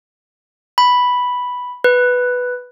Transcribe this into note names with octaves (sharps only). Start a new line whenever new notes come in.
B5
B4